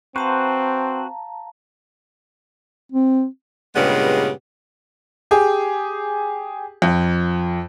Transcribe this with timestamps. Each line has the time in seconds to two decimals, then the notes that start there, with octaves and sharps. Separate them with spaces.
0.16 C4 F#4 B4 C5 F5 A5 A#5
2.92 C4
3.76 G2 A#2 C#3 G#3 B3 G4
5.31 G4 G#4
6.82 F2